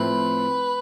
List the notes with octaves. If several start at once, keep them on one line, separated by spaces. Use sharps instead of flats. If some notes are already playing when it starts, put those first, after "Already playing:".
Already playing: A2 F3 A3 C4 B4